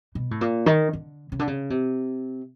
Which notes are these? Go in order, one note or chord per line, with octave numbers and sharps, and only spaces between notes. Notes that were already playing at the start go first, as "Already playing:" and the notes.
B2
A2
A#2
D#3
D3
C#3
D3
C#3
C3